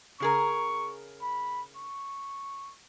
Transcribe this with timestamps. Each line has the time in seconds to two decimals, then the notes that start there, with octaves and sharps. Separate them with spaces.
0.20 C#3 G#4 A#4 C#6
1.22 B5
1.76 C#6